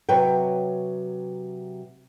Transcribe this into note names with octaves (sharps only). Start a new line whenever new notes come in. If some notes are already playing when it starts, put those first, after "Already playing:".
C3 F#3 B4 C#5 F#5 G5